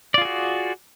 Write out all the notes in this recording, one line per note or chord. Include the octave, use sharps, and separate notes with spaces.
F4 F#4 G#4 D5